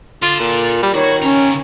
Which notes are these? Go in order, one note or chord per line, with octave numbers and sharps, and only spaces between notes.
F4 A4 D5
A#2
G3
D#3 F#4 C#5
C#3 C#4 A#5